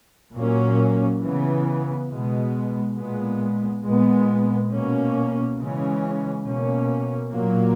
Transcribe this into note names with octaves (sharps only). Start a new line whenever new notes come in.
A#2 F#3 A#3 C#4
C#3 E3 B3
B2 G#3 B3
A#2 G#3 B3
A#2 G#3 B3
B2 A#3 C#4
C#3 E3 G#3 C#4
B2 A#3 C#4
A#2 F#3 A#3